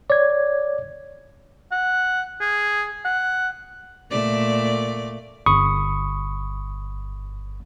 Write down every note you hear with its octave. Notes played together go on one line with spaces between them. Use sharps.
C#5 D5 G#6
F#5
G#4
F#5
A#2 A3 D5
G1 B5 C#6 D#6